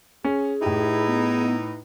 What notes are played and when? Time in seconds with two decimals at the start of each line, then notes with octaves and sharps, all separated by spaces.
0.24 C#4 G#4
0.62 A2 D#4 E4 G4 B4
1.07 B3